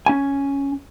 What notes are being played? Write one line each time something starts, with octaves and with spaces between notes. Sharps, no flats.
C#4 G#5